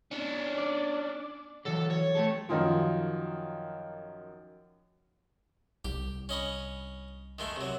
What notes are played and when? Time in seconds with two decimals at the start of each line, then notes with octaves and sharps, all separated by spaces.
0.11 C#4 D4
0.58 D5
1.65 E3 F#3 A4
1.90 C#5
2.15 A3 G4 A4
2.49 F#2 D#3 F3 F4
5.85 C2 G4
6.29 C#4 D#5 B5
7.39 D#3 G#3 A3
7.56 C3 F#3